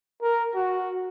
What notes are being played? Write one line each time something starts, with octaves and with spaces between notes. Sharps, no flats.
A#4
F#4